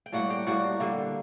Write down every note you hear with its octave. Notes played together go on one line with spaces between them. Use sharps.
G5
A2 G3 A#3 F#4 F#5
G4 G5
A2 G3 A#3 F#4 F#5
D3 G3 A#3